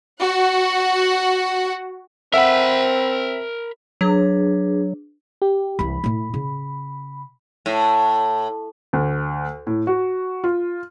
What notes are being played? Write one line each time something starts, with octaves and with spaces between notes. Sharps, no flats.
F#4 F#5
C4 A4 A#4 E5 F#5 G5 B5
F#3 D4 G#4 B4
G4
C2 E3 B5
A2 E4
C#3
A2
D2
A2
F#4
F4